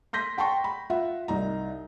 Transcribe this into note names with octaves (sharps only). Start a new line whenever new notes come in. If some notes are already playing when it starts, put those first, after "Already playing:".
C6 G6 A#6 B6
F#5 G5 A5 C6 C#6
B5
F4 E5 F#5
C2 D#4 A#5